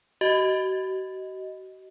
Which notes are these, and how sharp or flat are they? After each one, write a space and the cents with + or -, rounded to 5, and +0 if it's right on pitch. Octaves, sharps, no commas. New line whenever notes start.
F#4 +40 D#5 +5